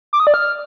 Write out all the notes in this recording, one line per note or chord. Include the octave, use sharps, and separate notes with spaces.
D6
D#6
D5
F6